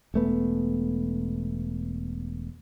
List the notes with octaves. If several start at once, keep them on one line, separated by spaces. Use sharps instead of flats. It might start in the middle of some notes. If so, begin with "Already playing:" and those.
E1 A3 B3